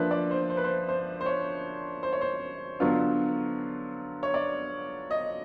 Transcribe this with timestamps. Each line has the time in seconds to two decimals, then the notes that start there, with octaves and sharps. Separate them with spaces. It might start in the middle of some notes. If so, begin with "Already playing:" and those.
Already playing: F3 A#3 D4 B4 E5
0.11 D5
0.31 C5
0.50 C5
0.57 B4
0.64 C5
0.89 C5
1.21 C5
1.26 C#5
2.03 C5
2.13 C#5
2.21 C5
2.80 D3 F#3 B3 D4 F4
4.23 C#5
4.34 D5
5.11 D#5